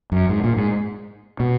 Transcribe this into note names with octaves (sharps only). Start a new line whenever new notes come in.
F#2
G#2
A#2
G#2
B2